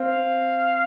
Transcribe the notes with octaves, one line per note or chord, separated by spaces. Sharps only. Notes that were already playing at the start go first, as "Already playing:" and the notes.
Already playing: C4 F5